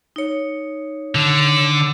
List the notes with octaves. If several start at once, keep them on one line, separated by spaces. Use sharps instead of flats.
D#4 C#5
D3